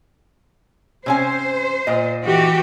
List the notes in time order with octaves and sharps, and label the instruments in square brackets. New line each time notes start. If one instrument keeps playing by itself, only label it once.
[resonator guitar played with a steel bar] C3 C#4 G#5 [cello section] C5
[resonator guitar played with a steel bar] A#2 D#5
[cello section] E3 F#4 G4